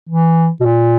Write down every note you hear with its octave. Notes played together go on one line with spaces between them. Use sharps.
E3
B2
A#2